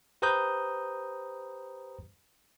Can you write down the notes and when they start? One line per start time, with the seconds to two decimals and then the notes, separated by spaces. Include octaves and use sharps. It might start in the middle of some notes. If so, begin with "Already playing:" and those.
0.22 G4 B4 C5 A#5 D#6 G6